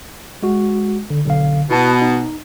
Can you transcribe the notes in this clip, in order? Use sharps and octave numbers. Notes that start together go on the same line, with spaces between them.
G#3 F#4
D3
B1 D3 F5
B2 E4 A5
D#4